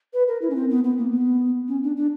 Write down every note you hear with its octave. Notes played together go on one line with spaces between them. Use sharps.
B4
A#4
E4
C#4
C4
B3
B3
A#3
B3
C#4
D4
D4